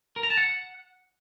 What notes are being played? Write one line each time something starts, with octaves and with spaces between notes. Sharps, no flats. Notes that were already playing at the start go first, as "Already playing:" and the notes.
A#4
A#5
A5
F#5